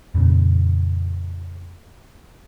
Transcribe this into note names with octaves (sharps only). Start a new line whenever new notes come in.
F2 A#2 C#3